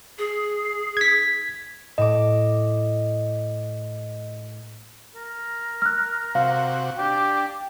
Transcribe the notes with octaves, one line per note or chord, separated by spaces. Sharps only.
G#4
G#6 B6
A2 D#5 D6
A#4
F6 F#6
C3 F#4 F5
D4 G4 G5